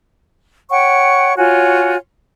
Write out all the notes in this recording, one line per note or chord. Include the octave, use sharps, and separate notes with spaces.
C#5 F#5 G5 C#6
F4 F#4 C#5 G#5